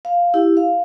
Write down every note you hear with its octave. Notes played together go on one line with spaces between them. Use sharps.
F5
E4 G4
F5